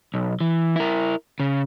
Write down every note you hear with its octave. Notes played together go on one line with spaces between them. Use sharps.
B1
E3
E4 A#4
C#3